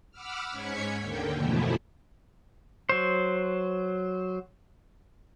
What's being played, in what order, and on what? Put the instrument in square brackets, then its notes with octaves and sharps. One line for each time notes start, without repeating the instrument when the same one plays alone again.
[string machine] F#5 B5 D6 E6 F6
G#2 C#4 G#6 B6 C#7
D#2 D3 A#3 G5
F#2 B2 E3 F3 A3 E4
[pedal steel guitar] F#3 C5